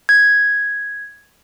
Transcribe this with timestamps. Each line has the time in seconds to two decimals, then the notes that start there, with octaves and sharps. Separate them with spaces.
0.09 G#6